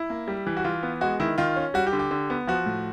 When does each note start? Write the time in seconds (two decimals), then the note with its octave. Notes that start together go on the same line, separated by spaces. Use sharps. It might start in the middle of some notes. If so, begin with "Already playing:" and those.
Already playing: E4
0.10 A#3
0.28 G3
0.46 E3
0.57 F#4
0.64 E3 F4
0.83 B3
1.01 G#3 F#4
1.20 D#3 E4
1.38 D#3 F4
1.56 C#4
1.74 G3 F#4
1.87 G4
1.93 D3
1.99 G4
2.11 D3
2.30 B3
2.47 F3 F#4
2.66 A2